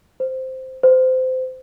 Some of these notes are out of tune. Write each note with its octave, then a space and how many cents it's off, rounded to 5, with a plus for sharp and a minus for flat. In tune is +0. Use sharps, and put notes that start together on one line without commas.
C5 -5
C5 -25